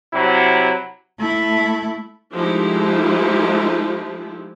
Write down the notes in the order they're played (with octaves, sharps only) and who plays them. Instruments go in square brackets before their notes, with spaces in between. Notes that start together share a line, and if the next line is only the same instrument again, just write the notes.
[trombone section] C3 F#3 E4
[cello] A3 E4
[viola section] F3 G#3 A3 D#4 E4 G4